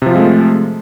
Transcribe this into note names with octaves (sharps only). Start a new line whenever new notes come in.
C3 F3 G#3 A3 F4